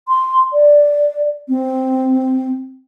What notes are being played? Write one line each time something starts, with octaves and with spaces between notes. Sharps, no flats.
C6
D5
C4